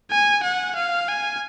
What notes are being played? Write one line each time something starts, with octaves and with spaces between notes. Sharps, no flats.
G#5
F#5
F5
G#5